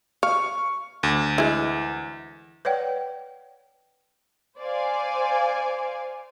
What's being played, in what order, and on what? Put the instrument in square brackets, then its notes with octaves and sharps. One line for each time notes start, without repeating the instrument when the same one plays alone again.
[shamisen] F5 [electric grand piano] C#6
[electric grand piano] D2
[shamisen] E3 G#3
[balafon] B4 C#5 D5 F#5 G5
[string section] C5 D5 F5 G#5